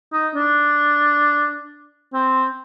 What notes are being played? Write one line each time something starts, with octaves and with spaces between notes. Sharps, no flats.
D#4
D4
C4